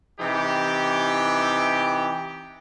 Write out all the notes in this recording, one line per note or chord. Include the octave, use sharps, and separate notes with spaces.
C3 E3 D#4 G4